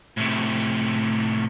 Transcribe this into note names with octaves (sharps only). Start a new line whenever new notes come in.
A2 C3